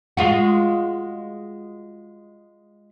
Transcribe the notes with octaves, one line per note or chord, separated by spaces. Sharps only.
G#3 F4 F#4